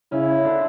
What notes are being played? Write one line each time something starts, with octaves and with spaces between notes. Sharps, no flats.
C#3 C#4 E4
D3 D4